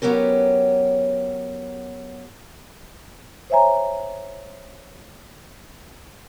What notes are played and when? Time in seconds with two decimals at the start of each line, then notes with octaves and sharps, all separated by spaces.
0.02 F#3 B3 C#4 G4 A#4
3.50 C5 C#5 E5 G#5 A#5